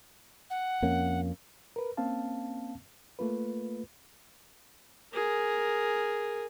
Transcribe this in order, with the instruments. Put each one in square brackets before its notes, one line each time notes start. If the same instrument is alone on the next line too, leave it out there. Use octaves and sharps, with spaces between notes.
[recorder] F#5
[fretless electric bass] F2 A#3 C#4
[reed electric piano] A#4 B4
A#3 C4 C#4 F5 A5
A3 A#3 F4 B4
[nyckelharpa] G#4 A#4